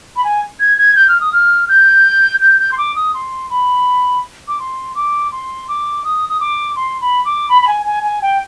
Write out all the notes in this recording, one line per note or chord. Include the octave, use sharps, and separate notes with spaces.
B5
G#5
G#6
G#6
G6
F6
D#6
F6
G6
G6
G6
C6
D6
D#6
C6
B5
D6
C6
D6
C6
D6
D#6
D#6
D6
C6
B5
D6
B5
B5
G#5
G#5
G#5
G5